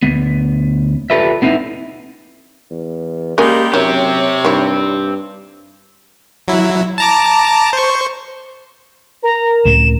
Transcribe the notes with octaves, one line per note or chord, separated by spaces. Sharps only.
D2 B3
F4 G4 A4 B4 D5 E5
B3 C4 D#4 E4
E2
G3 G#3 A#3 C#4 G4 A#4 G#5
F#2 C3 D#3 C4 G4 C#5
G2 D#3 E4
F#3 E4
A5 A#5 D6
C5 C#6
A#4 A#5
C#2 A2 E7